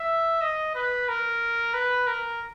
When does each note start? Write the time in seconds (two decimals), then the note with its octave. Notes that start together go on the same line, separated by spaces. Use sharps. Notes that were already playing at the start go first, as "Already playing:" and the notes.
Already playing: E5
0.42 D#5
0.75 B4
1.08 A#4
1.74 B4
2.07 A#4